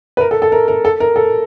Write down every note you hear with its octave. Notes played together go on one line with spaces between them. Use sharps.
B4
A#4
A4
A4
A#4
A#4
A4
A#4
A4